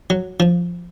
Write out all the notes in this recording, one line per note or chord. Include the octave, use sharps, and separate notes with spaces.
F#3
F3